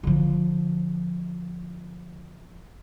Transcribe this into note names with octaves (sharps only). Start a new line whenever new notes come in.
D3 F3